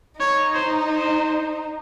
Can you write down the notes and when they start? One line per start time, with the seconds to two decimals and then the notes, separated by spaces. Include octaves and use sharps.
0.19 D#4 C#5
0.54 C5
0.89 C5